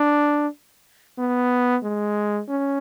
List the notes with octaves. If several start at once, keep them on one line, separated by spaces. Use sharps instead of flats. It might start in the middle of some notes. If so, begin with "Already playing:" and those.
Already playing: D4
B3
G#3
C#4